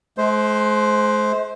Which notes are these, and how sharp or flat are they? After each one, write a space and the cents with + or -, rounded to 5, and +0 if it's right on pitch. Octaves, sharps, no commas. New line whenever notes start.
G#3 +45 C5 +0